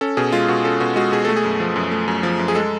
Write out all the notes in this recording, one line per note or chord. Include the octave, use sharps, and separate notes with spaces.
C#4 A4
B2 G#4
G#3 F4
B2 F#4
C#4 A4
B2 F#4
G#3 F#4
B2 G#4
A3 A4
G#4
F#2
F3
F#2
A3
F#2
F3
F#2
G#4
G#3 A4